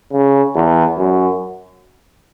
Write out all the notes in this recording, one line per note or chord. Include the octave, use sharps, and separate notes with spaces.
C#3
E2
F#2